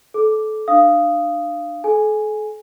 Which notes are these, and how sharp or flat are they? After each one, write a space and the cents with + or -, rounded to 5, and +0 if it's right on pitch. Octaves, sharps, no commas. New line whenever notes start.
A4 -25 D6 +0
D4 +30 F5 -15 D#6 +0
A4 -45 G#5 +0